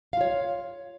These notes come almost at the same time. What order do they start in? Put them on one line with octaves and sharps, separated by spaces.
F5 F4 C#5